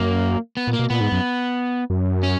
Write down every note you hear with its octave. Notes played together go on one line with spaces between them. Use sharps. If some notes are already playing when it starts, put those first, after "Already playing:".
Already playing: F#2 A#3
B3
A#2
A#3
B2
A#2 B3
G#2
F#2
F#2
C#4